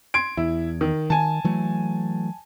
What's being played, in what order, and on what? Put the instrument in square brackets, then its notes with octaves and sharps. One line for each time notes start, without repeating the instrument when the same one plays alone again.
[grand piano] C6 G#6 D7
[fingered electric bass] E2 [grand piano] E4
[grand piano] D#3
[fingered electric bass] D#3 [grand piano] G#5 A5
[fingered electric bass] E3 F#3 A3